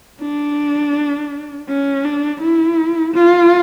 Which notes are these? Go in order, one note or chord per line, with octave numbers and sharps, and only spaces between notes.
D4
C#4
D4
E4
F4